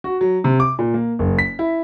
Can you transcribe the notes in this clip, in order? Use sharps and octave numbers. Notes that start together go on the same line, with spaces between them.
F#4
F#3
C3
D6
A#2
A#3
F#1
B6
E4